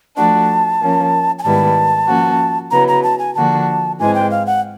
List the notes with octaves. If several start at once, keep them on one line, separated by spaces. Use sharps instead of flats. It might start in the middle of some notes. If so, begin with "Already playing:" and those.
F3 A3 D4 F#4 A5
F3 A#3 C#4
G#5
G#2 D#3 G3 B3 E4 A5
F3 A#3 C#4 F#4
C#3 F#3 B3 E4 A#5
A#5
A5
G#5
D3 F3 A#3 D4 F#4 A5
G#2 E3 G#3 C4 G#5
G5
F5
F#5